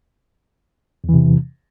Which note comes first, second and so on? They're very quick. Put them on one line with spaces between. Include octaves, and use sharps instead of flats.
E2 E3 C3